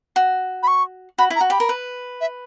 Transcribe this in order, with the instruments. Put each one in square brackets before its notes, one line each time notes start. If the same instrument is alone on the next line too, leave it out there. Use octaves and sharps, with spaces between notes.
[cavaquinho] F#4
[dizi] B5
C#6
[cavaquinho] F#4 [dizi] B5
[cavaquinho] E4
[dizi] A#5
[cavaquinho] F#4
[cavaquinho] G4 [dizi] B5
[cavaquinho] A#4
B4
[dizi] E5